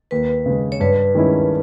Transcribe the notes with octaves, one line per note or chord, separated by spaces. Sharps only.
D#2 B4
C#3 G#3
C#5
G2 B4
D#3 G#3 C#4 E4